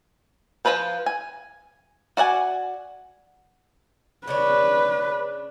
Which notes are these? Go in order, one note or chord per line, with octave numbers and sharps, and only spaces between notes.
F3 A#3 F4 B4 C5
G#5
F#4 D5 F#5 G#5
C#3 D4 B4 C#5